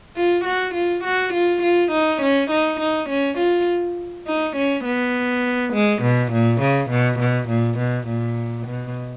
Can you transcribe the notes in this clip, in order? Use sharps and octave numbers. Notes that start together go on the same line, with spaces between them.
F4
F#4
F4
F#4
F4
F4
D#4
C#4
D#4
D#4
C#4
F4
D#4
C#4
B3
G#3
B2
A#2
C#3
B2
B2
A#2
B2
A#2
B2